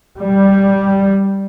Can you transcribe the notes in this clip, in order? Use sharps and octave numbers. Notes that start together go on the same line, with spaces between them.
G3